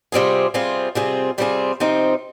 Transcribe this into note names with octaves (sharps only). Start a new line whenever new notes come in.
C3 G3 C4 F4 G#4
C3 G3 C4 F4 G#4
C3 G3 C4 F4 G#4
C3 G3 C4 F4 G#4
C3 F3 C4 D#4